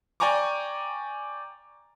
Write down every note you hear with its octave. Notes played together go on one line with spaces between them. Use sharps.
D5 G5 G#5 A#5 C#6 D6